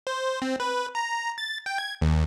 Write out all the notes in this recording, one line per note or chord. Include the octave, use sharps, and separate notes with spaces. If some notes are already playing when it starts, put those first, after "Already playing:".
C5
C4
B4
A#5
A6
G5
G#6
D#2